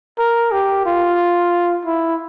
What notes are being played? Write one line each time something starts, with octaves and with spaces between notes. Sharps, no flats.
A#4
G4
F4
E4